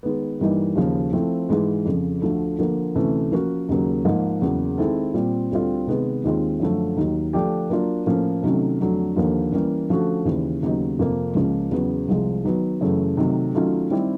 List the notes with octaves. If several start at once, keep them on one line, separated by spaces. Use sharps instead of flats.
D#3 G#3 B3
G2 E3 G3 A#3 D#4
D#2 C#3 F3 A#3
F3 A3 C4 E4
G#2 E3 G#3
F2 C#3 F3
D2 D3 F3 A3
D3 F3 A#3
D2 C3 E3 A3 C#4
F3 A#3 C#4 F#4 A#4
D#2 C#3 F#3 A#3
G#2 F3 A#3 D#4
E2 C#3 F#3 A#3
D#3 G#3 C4 E4 A4
A#2 G3 C4 F4
D2 D3 G3 C4 F4
C3 D#3 G#3 B3
D#2 D#3 G#3 C4 F4
F#2 D3 F3 A3
D#2 D#3 F#3
D3 F3 A3 D4 G4
F#3 A#3 D4 F4
A2 F3 A#3 C#4
C3 D#3 F#3 A3 C#4
F2 D3 F#3 A3 D4
D#2 D3 F3 A#3
E3 G3 A#3 C#4
D3 F3 A3 C#4 F#4
D#2 C#3 E3
D#2 C#3 F#3 B3 D#4
F2 C3 F3 A#3
C#2 C#3 F3 A#3 C#4
E2 C#3 F#3 B3
C2 C3 F3 G#3
D#3 F#3 B3
F#2 C#3 E3 A3
C3 D#3 F#3 A3
D#3 F#3 A3 C#4 F4
D#3 G3 C4 E4 G4